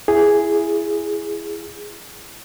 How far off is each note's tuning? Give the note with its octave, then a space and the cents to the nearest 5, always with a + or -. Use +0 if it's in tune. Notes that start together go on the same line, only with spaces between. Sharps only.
E4 +25 G#4 +0